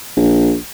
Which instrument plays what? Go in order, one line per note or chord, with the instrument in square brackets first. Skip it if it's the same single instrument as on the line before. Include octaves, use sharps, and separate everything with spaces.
[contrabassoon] A#1